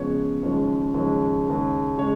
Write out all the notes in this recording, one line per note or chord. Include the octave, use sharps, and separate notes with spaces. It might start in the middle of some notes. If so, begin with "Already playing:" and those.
Already playing: C#3 F3 G#3 B3 C#5
D#2 C#3 F3 G#3 C#4
D#2 C#3 F3 G#3 C#4
D#2 C#3 G#3
C#3 G#3 C#5